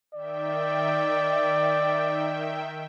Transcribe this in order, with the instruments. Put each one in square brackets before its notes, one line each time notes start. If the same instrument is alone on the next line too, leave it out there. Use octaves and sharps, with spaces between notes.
[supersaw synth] D#3 E5 G5 [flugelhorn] D5